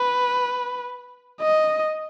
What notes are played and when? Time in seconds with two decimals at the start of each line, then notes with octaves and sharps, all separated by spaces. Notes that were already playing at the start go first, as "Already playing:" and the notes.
Already playing: B4
1.41 D#5